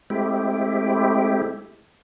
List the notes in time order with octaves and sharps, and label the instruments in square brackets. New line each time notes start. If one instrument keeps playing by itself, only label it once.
[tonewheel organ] G#3 A3 C4 E4 G4